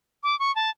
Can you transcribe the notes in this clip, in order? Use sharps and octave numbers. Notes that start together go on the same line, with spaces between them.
D6
C#6
A5